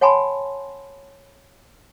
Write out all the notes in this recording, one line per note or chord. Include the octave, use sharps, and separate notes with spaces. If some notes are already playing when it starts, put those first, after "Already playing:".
C#5 F#5 G#5 A5 B5 C6